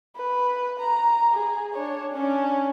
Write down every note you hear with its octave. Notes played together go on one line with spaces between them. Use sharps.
B4
A#5
G#4
D4 C#5
C#4 D4